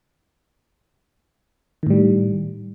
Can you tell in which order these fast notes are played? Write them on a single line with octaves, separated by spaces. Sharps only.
D#3 A2 G3